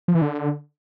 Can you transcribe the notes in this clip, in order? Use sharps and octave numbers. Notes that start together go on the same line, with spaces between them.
F3
E3
D3